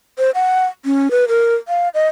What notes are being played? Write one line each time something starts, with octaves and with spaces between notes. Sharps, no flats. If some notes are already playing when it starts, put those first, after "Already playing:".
C5
F#5
C#4
B4
A#4
F5
D#5